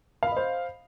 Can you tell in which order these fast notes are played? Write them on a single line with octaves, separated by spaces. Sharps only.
F5 B5 D#5 C5